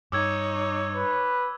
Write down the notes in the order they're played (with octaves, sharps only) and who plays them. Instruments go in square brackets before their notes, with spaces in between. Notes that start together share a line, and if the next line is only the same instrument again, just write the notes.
[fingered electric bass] G2 [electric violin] D#4 C#5 [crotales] D6 E6 G#6
[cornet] B4